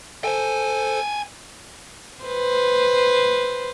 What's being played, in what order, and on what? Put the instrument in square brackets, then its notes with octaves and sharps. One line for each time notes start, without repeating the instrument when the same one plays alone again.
[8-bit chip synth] A4 C5 [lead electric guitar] G5 G#5
[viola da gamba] B4 C5